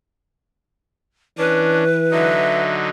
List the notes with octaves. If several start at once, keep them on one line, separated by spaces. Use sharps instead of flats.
E3 C#4 D4 B4
D3 F#3 D#4 E5